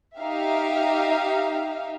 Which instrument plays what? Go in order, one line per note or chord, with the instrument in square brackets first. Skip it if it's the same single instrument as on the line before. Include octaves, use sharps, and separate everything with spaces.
[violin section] D#4 G4 E5 F5